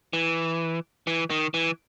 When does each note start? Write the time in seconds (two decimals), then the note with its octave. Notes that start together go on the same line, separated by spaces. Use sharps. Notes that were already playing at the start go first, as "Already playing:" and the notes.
0.13 E3
1.07 E3
1.30 D#3
1.54 E3